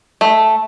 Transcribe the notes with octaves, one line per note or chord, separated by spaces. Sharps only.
A3